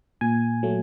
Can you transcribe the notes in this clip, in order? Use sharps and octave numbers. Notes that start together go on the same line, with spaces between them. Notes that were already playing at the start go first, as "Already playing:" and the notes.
A#2 G#5
F#3 A3